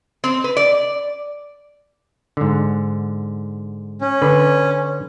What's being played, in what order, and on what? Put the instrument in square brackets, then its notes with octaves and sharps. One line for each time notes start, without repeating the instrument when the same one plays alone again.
[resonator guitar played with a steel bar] C4
B4
D5
[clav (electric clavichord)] G#2 D3
[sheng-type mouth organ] C#4
[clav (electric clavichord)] D3 B4